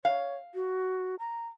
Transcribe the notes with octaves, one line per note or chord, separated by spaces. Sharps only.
C#5 F5
F#4
A#5